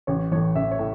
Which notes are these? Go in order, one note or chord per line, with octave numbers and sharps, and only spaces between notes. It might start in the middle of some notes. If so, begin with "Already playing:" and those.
A1 C#5
A2 E3 C#5
A1 E5
C#5
A2